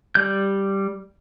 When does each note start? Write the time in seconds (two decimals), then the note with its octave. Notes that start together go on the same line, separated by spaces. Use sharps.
0.15 G3 G6